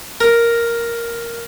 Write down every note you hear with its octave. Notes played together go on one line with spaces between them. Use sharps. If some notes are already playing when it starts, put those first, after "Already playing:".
A#4